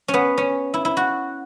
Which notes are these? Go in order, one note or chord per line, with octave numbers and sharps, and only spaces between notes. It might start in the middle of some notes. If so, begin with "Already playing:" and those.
C#4
B3
C#4
E4
E4
F#4